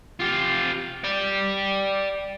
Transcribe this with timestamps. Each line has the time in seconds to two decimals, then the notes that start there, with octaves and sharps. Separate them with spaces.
0.20 F4 G4
1.04 D5 G5